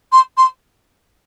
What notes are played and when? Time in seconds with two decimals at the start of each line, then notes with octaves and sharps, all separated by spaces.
0.12 C6
0.37 C6